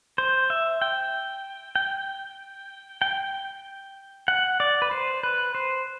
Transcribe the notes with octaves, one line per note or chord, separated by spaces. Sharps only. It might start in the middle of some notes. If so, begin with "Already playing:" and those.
C5
E5
G5
G5
G5
F#5
D5
B4
C5
B4
C5